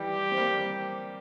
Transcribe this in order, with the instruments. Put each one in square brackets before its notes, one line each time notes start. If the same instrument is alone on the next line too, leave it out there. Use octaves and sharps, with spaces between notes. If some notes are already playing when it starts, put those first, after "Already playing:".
Already playing: [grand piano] E3 G3 [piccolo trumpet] G4
[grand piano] C4
G3 A#3